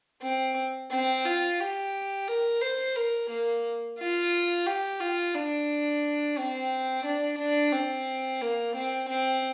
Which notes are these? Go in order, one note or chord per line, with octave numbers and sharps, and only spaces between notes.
C4
C4
F4
G4
A#4
C5
A#4
A#3
F4
G4
F4
D4
C4
D4
D4
C4
A#3
C4
C4